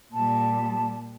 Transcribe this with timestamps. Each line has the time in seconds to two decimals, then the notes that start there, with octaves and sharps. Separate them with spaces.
0.13 A#2 G3 A5